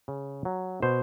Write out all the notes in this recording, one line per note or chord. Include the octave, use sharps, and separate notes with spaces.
C#3
F#3
B2 C5